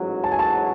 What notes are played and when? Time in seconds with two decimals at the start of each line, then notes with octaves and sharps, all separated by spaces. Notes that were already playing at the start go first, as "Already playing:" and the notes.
Already playing: A1 G#2 F#3
0.24 A5
0.32 G#5
0.39 A5